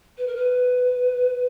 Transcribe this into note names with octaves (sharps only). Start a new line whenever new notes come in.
B4
A#4
B4